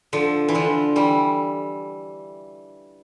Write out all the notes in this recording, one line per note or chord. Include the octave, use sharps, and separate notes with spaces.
D3 F3
E3
D3 F3
E3 G3